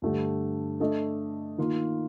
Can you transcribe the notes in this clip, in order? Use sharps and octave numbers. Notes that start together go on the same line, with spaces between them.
G2 D3 A3 D4 G4
A3 D4 A4 D#5
D#3 A#3 F4